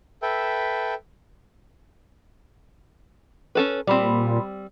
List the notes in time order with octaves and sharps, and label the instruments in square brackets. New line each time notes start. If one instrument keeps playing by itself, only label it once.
[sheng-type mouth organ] A4 B4 E5 G5
[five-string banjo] C#4 A4 B4
[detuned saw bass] A#2 [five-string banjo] G3 C4 [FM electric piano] D5 B5 C6